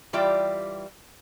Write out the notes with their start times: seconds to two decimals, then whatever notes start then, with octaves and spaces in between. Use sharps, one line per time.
0.13 E3 G3 F4 G4 D5 E5